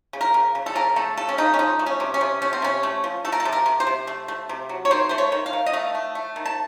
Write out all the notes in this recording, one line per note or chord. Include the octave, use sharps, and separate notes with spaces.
C#3
A#4
C#3
C#3
A4
C#3 A#4
A3 A4
C#3 A4
C#4
C#3 D#4
C#4
F3 D#4
A3
C#4
C3
C#4
C3
A3 C#4
C4
C3 C#4
A3
F3
A3 A4
A#4
A4
C3
A#4
C3
C5
C3
A3
A3
C3
F#3
C#5
D#3 C5
A3 C5
C#5
D#3
F5
D#3
D#5
A3 F5
A3
A3
D#3
A5